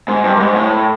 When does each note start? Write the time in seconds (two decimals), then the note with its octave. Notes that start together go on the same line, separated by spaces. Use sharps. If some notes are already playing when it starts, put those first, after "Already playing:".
0.08 G#2
0.25 G2
0.35 G2
0.40 G#2
0.56 A2